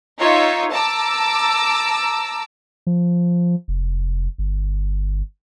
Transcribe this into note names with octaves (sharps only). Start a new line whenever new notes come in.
D#4 F4 C#5 E5
A5 A#5 D6 E6
F3
F1
G1